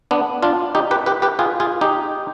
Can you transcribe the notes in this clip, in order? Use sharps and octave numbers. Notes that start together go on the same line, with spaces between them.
B3 D4
D4 F4
D#4 G4
G4 B4
G4 B4
G4 B4
F4 G#4
F4 G#4
D#4 G4